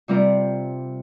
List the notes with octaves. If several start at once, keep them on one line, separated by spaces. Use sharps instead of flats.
C3 G3 C4 F4 A#4